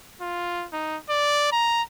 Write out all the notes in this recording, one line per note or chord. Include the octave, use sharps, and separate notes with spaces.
F4
D#4
D5
A#5